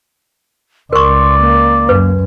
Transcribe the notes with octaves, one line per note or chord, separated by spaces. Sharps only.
C#2 A#4 D5 C6 C#6
A#3
F#2 B4